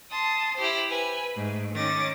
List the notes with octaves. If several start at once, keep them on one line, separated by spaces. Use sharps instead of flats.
A5 C6 D#6
E4 G4 C5
B4 G#5
G#2 A3
D#3 C#4 D6 A6 A#6